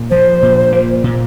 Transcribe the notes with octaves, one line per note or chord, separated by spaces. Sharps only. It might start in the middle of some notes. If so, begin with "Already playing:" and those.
Already playing: A#2
F3 C5
A#2
A#3
A#2